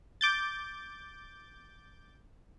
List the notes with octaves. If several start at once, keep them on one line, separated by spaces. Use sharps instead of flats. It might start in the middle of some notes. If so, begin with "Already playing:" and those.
D6 G6 A6